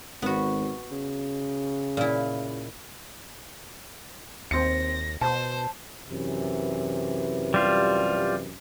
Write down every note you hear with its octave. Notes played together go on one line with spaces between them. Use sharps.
G#1 B3 F#4
C#3
A#2 E4
D#2 C4 A#6 C#7
B2 C5 A5
F#2 C3 E3
G3 F4